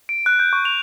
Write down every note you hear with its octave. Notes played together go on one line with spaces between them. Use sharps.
D7
F#6
G6
C#6
F7